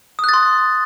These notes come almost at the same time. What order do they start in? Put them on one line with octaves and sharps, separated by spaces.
D#6 F#6 A6 C6